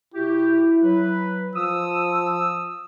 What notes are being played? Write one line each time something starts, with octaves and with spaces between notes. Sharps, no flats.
C3 E4 F#4 G4
F#3 B4
F3 D#6 E6